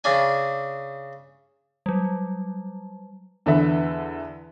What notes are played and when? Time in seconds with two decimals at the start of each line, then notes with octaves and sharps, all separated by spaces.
0.04 C#3 D4 G#5
1.86 F#3 G3
3.46 E2 D3 A4 B4 E5